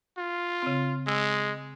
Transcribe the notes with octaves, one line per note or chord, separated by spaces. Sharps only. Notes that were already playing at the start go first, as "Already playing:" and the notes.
F4
C#3 C4
G#3 E6